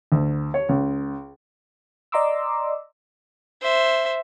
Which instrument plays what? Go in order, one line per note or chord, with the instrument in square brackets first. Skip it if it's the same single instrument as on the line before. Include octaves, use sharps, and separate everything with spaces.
[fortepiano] D2
C#5
C#2
[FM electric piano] D5 D#5 A#5 C6 D6 E6
[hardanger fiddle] C5 E5